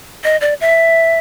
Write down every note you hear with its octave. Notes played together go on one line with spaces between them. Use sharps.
D#5
D5
E5